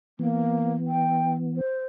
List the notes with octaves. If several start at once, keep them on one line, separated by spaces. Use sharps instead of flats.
E3 A#3 B3
G5
C5